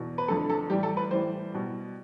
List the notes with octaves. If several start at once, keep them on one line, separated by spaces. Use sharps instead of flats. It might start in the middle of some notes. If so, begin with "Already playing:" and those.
Already playing: E2 B2
B4
F2 D3 A3 A4
A4
A2 E3 G3 G4
A4
B4
A2 E3 G3 C5
B2 G3